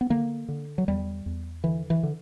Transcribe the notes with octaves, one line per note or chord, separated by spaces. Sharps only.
B3
D3 A#3
D3
F#3
E2 G3
E2
D3 E3
E3
D3